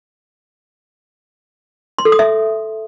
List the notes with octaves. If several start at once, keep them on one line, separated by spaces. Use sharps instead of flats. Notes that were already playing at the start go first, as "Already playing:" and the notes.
C6
A4
D#6
E5